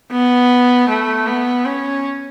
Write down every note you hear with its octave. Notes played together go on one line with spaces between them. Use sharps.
B3
A3
B3
C#4